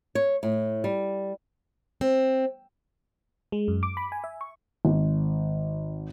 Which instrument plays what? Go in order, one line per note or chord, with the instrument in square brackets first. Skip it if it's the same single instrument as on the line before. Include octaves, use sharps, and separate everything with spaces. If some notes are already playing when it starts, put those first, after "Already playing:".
[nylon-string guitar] C#5
A2
G3
[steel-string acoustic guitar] C4
[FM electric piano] G#3
F#2
D6
B5
G#5
E5
C#6
[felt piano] G#1